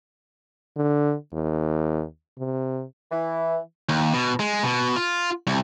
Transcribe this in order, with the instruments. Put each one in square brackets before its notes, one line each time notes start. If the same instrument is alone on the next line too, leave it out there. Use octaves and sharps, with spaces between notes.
[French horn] D3
D#2
C3
[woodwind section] E3
[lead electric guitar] D#2
B2
G#3
B2
F4
C2